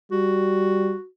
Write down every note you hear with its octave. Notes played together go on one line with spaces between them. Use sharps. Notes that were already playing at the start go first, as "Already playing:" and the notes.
G3 F#4